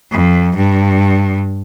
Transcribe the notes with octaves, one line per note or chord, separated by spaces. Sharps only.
F2
G2